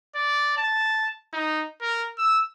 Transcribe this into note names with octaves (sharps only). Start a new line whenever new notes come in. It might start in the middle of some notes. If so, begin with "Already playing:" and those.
D5
A5
D#4
A#4
E6